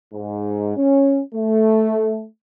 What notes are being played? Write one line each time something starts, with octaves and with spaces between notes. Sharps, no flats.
G#2
C#4
A3